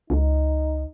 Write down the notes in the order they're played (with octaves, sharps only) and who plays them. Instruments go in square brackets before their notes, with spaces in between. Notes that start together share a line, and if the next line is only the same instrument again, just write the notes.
[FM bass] C#2 [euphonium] D#4